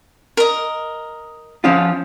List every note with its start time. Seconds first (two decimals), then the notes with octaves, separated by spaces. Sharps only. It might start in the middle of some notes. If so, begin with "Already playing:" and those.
0.37 A#4 D#5
1.64 F3 C#4 F4